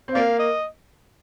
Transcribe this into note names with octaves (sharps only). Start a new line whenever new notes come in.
C4
A#3 D5 F5
D#5